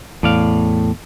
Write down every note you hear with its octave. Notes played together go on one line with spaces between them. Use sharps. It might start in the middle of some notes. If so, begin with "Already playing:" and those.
E2 A2 D5 F5